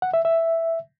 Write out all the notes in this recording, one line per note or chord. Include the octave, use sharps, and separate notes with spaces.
F#5
E5
E5